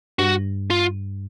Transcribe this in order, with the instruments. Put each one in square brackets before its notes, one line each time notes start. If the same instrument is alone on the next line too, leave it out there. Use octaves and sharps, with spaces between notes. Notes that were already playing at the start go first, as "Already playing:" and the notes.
[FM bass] G2 [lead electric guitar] F#4
[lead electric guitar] F4